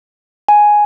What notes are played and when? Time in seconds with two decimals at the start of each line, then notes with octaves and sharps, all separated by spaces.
0.48 G#5